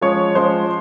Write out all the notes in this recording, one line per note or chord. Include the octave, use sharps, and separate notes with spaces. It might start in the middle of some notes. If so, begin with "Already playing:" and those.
F3 G#3 C#4 C#5
F3 G#3 C#4 C5